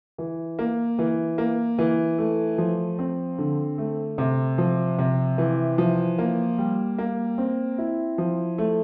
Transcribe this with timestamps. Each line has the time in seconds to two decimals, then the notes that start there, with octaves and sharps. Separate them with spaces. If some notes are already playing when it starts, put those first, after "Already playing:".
0.18 E3
0.59 A#3
0.99 E3
1.38 A#3
1.78 E3
2.18 A3
2.58 F3
2.99 C4
3.38 D3
3.78 A3
4.18 C3
4.58 F3
4.99 C3
5.38 E3
5.78 F3
6.18 A#3
6.58 G3
6.98 A#3
7.38 C4
7.78 E4
8.18 F3
8.58 A3